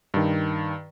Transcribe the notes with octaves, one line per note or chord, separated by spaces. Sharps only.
G2 D#3